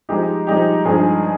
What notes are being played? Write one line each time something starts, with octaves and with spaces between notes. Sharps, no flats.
F3 G#3 D#4 G4
F3 G#3 D#4 G4
G2 F3 G#3 D#4 G#4